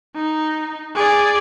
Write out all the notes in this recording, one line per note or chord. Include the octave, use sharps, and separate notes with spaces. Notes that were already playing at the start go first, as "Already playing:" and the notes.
D#4
G#4 D5